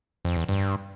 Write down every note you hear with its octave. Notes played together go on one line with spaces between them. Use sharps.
F2
E2
G2